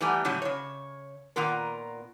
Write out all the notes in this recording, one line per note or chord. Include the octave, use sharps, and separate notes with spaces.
E3 G3 A3 B3 G#5 A#5
A2 C#3 F#3 G3 C#4 E4
C#3 C#5
A#2 D#3 B3 F4 A#4